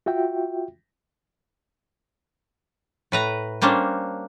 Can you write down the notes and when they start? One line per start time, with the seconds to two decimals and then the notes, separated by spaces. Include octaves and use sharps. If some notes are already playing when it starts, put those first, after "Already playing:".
0.06 F4 F#4 E5 G5
3.12 A2 B4 A#5
3.62 G3 A#3 C#4 D4 C5